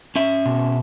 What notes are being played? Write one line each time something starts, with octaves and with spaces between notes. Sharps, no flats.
C#4 E5
B2